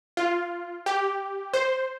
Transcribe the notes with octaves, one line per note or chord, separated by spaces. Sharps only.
F4
G4
C5